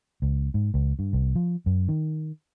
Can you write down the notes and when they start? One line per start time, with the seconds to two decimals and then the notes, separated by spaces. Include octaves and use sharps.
0.22 C#2
0.54 G#2
0.74 C#2
0.99 G2
1.13 C2
1.36 F3
1.66 F#2
1.89 D#3